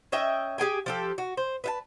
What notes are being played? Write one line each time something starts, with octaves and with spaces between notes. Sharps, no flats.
C#4 D#5 E5 G5
G4 G#4 G5 G#5
F3 G4 A4
F#4
C5
B4 E5 A5